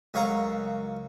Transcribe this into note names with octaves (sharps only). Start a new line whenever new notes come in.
C#2 F#2 C#5 F5 F#5 A#5